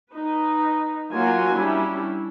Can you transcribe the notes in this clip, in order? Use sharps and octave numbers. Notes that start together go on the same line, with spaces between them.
D#4 B4
F#3 A#3 F4 F#4 G#5
G3 C#4 D4 E4